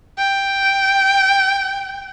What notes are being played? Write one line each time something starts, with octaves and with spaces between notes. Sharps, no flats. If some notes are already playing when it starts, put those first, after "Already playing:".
G5